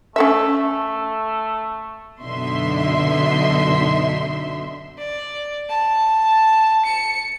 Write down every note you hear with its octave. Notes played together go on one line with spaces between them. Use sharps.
A3 C#4 A4 E5
A3
F#2 B2 D3 D#4 E5 C6
D5
A5
C#7